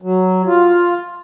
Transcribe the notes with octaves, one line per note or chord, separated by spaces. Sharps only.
F#3
F4